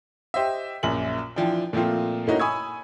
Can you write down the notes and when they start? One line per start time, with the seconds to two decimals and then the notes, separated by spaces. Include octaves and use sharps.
0.34 G4 C5 D#5 E5
0.83 A#1 F#2 A#2 F#7
1.36 E3 F3 D4 G5
1.73 A#2 F3 A3 C4 F4
2.27 A2 A#3 C#4 D#4 F#4
2.39 G#5 B5 C#6 D#6 E6 G#6